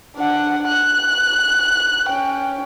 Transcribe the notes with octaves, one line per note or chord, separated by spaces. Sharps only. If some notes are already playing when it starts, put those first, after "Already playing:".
D4 F#5
F#6
C#4 G5